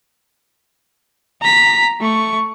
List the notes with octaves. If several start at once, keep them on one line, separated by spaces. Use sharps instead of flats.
A#5 B6
A3 C#6